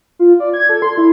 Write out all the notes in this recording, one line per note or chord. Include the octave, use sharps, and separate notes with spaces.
F4
D5
G#6
A4
C6
E4